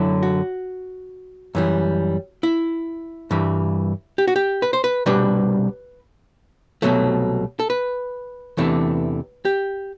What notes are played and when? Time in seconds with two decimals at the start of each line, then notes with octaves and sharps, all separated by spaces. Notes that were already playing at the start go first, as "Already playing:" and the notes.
Already playing: F#2 D3 F#3 E4
0.23 F#4
1.55 F#2 E3 G3
2.43 E4
3.31 G2 E3 G3
4.18 G4
4.28 F#4
4.36 G4
4.62 B4
4.73 C5
4.84 B4
5.06 C2 B2 G3 D4 B4
6.82 C2 B2 F#3 A3
7.60 A4
7.70 B4
8.57 E2 C3 E3 A3 D4
9.45 G4